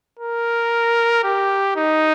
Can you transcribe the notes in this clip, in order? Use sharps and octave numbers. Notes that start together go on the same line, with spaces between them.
A#4
G4
D#4